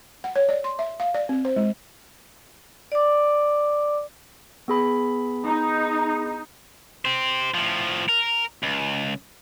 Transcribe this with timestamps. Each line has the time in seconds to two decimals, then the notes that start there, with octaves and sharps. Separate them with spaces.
0.24 F#5
0.36 C#5
0.49 D5
0.64 C6
0.79 E5
1.00 F5
1.14 D5
1.29 C4
1.45 C5
1.56 G#3
2.92 D5 D6
4.68 B3 G#4 B5
5.46 D#4
7.05 G4 C5
7.54 A2 F3
8.09 A#4
8.63 C#2